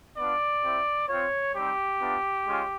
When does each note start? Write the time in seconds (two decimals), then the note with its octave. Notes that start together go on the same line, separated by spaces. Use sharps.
0.17 B3 D4 F4 D5
0.63 C4 E4 G4
1.09 C4 F4 C#5
1.55 G3 C4 D#4 G4
2.00 B3 D4 F4
2.46 G#3 C#4 F4